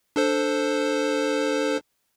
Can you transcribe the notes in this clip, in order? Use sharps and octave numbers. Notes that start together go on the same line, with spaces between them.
D4 A4 C5